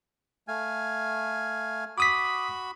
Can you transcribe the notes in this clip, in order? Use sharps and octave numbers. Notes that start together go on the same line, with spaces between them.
A3 F5 G#5
F#4 B5 D6 D#6 B6